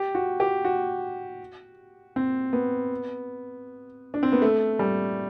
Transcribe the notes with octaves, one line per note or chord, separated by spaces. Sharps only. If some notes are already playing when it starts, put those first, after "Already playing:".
Already playing: G4
F#4
G4
F#4
C4
B3
D4
C4
B3
A3
G3